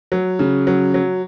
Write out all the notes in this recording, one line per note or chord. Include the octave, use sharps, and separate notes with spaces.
F#3
C#3
F#3
F#3